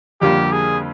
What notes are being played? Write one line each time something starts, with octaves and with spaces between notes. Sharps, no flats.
F2 D3 G3 A#3 F4 G4
G#4